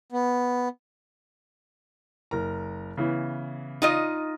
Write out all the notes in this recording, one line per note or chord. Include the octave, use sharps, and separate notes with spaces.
B3
F#1 A#4 A#5
C#3 E3 B3
D#4 F4 D#5